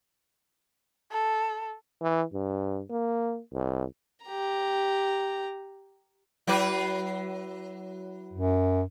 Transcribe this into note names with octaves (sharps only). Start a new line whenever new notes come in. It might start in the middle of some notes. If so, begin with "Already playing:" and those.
A4
E3
G2
A#3
C2
G4 A#5
F#3 E4 B4
F#2